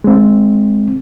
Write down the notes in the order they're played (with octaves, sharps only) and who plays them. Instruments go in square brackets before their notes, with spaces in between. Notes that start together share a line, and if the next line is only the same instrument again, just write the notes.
[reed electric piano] G#3 C4